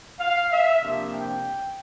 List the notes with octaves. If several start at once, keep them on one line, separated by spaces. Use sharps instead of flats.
F5
E5
C3 F3 A#3 D4
G5